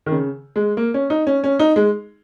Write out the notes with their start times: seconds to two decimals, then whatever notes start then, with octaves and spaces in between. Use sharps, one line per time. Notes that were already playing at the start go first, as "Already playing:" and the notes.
0.06 D#3
0.12 C#3
0.56 G#3
0.77 A#3
0.94 C#4
1.10 D#4
1.27 C#4
1.44 C#4
1.59 D#4
1.76 G#3